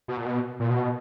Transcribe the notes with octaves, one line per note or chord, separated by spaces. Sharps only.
B2
A#2
B2
A#2
B2